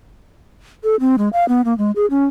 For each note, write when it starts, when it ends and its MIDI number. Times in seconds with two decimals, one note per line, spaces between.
0.84 0.96 69
1.00 1.16 60
1.18 1.29 56
1.33 1.47 77
1.48 1.61 59
1.65 1.77 58
1.78 1.91 56
1.96 2.06 68
2.11 2.25 61